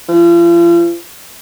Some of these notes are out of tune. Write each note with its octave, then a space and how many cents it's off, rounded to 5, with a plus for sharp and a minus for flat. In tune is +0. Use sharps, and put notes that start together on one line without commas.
F3 -40